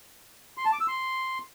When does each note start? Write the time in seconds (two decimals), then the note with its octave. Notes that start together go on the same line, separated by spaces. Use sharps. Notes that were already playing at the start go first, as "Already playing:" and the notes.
0.57 C6
0.65 A5
0.73 D6
0.80 E6
0.88 C6